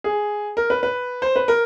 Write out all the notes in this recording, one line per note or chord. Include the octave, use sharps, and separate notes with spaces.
G#4
A#4
B4
B4
C5
B4
A#4